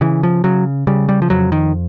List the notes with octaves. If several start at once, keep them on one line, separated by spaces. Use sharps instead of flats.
C#3 E3
F3
C#3 F#3
C#3 G3
G3
F3
F2 F#3
D#3